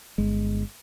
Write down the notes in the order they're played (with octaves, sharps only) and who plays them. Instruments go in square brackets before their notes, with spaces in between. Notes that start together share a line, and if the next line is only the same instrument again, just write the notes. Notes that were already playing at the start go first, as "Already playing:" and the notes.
[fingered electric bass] G1 G#3